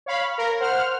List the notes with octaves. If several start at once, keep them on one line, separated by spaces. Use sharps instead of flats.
C#5 F5 B5
A#4
C5 F#5 F6